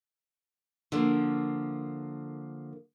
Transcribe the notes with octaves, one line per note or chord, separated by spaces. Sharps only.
D3 F3 A#3